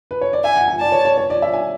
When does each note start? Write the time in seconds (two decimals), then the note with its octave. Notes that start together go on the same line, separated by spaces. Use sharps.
0.11 B4
0.21 C#5
0.33 D5
0.44 E5 G#5
0.56 F#5
0.68 G#5
0.80 D5 A5
0.92 C#5
1.05 C#5
1.18 C#5
1.30 D5
1.42 E5
1.54 G#5